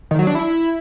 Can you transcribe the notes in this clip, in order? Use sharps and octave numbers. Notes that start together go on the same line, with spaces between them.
D#3
F#3
D4
E4